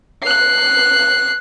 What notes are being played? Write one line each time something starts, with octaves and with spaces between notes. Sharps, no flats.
F#6 C7